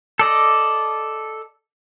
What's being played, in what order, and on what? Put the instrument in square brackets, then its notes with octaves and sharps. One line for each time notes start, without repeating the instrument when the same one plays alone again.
[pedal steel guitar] A4 D5 D#5